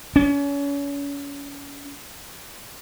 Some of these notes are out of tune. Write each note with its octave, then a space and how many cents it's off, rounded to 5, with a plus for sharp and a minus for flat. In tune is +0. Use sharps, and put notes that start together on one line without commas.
C#4 +35